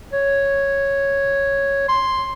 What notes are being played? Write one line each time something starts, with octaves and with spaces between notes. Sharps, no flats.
C#5
C6